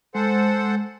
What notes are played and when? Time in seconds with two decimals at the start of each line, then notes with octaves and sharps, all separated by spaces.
0.15 G#3 A4 C5 F#5